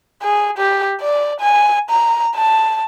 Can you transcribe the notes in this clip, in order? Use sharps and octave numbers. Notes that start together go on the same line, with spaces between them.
G#4
G4
D5
G#5
A#5
A5